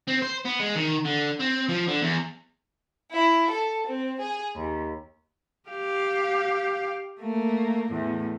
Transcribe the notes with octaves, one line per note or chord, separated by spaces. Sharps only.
C4
C5
B3
G#3
D#3
D3
C4
F3
D3
E2
E4
A4
C4
G#4
D#2
G4 F5
A3 A#3
E2 A2